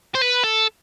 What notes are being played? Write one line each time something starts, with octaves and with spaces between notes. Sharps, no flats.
C5
B4
A4